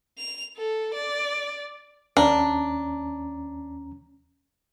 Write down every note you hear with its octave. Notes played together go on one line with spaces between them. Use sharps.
F7
A4
D5
D#2 C#4 D4 A#5